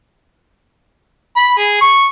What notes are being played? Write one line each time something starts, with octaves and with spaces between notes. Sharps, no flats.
B5
G#4
C#6